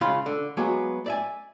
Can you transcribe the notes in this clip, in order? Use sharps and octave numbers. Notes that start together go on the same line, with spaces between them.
C#2 C#3 F4 F5 B5 C6
D3
F#3 G#3 A#3 B3 F#4 G#4
D5 E5 G#5